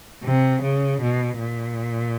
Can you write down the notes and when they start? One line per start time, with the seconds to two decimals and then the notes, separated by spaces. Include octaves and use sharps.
0.24 C3
0.63 C#3
1.01 B2
1.40 A#2